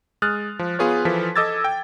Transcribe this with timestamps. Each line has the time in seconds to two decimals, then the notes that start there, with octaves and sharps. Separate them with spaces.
0.22 G#3 D#6 F6 F#6 A6
0.59 F3
0.79 B3 F4 G#4 B4 C#5
1.05 E3 F3 A4 B6
1.36 A4 D#5 D6 E6 G#6 A6
1.64 G5